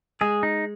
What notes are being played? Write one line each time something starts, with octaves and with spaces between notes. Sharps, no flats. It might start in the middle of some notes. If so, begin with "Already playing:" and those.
G#3 G#4
D#4